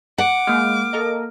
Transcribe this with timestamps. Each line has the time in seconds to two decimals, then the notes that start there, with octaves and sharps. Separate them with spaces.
0.18 F#5 D6
0.47 G#3 A#3 F6
0.93 A4 A#4 D#5